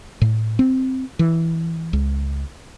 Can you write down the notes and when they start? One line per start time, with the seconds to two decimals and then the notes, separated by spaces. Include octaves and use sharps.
0.22 A2
0.59 C4
1.19 E3
1.93 C#2